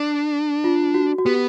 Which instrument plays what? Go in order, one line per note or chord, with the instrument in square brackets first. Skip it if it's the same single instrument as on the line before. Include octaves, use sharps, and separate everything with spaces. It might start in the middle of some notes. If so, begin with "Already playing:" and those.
Already playing: [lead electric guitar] D4
[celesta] F4
F#4
F#4
[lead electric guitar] B3 [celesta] G4